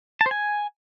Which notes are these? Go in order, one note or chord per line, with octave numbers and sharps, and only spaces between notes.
A5
C5
G#5